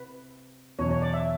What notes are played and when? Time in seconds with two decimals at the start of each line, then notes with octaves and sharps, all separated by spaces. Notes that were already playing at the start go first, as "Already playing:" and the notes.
Already playing: C3 B4
0.78 E2 B2 F#3 C#5
0.91 C#5
1.02 D5
1.13 E5